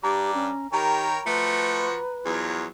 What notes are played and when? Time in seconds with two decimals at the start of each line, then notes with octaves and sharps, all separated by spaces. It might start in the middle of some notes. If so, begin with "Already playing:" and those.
0.04 G2 G4 D5 A#5
0.34 C#4
0.73 D#3 G4 A#4 C#5 G5 A#5 B5
1.26 F3 A3 F#4 B4
2.25 E2 F3 F#3